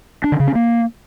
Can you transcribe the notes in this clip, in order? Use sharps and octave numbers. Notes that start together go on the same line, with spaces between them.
D4
D3
C#3
C#4
A#3